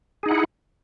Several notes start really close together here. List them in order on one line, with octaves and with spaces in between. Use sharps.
G#4 D#4 F#5 E4